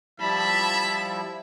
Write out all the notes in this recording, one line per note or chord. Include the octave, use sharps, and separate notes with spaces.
F3 G3 E4 E5 A5 B5